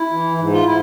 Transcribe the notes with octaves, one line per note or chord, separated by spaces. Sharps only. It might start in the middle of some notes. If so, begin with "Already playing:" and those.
Already playing: E4
E3
G#2
F4
E4